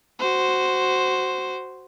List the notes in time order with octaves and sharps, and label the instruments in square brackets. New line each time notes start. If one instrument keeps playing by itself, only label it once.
[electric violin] F#4 C5